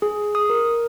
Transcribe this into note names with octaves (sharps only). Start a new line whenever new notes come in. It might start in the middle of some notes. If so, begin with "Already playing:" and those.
G#4
D#6
A#4